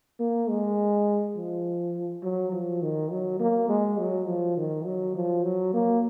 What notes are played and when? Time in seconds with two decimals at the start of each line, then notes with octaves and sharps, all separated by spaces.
0.19 A#3
0.49 G#3
1.36 F3
2.23 F#3
2.53 F3
2.82 D#3
3.11 F#3
3.40 A#3
3.68 G#3
3.98 F#3
4.27 F3
4.57 D#3
4.85 F#3
5.15 F3
5.43 F#3
5.73 A#3